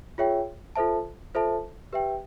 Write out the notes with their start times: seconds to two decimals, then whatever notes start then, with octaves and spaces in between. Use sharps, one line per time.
0.18 F4 G#4 C#5 E5 G5
0.76 F4 A4 C5 E5 A5
1.34 F4 A4 C5 E5 A5
1.93 G4 B4 E5 G5